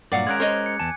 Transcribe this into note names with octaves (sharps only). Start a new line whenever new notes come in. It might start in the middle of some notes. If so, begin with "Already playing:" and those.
G2 A#2 F#3 D5 F5 F#5 D6
G#3 C#4 A#4 F#6 G#6
C5 C#5 D#5
C#7
E2 G#5 A5